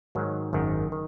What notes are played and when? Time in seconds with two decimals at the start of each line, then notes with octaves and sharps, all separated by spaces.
0.15 G#2 D#3 F#3
0.53 G#1 F#2 D#3
0.92 D#3